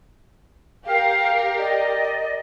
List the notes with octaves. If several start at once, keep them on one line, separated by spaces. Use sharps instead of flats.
G4 A#4 F5
D5 D#5